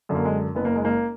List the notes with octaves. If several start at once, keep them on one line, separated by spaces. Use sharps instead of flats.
F#2 D3
A#3
G#3
F#1 B3
A#3
G#3
A#3